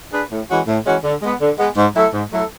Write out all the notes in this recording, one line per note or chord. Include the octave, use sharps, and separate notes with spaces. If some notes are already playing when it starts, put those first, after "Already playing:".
D4 G#4 B4
A2
E3 G#3 C#4 F#4
A2
E3 G#3 C#4 F#4
D3
G#3 B3
D3
G#3 B3
G#2
F#3 A3 E4 A4
G#2
F#3 A3 E4 A4